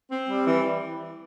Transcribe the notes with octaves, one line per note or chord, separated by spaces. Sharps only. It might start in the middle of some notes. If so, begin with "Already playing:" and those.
C4
G3
E3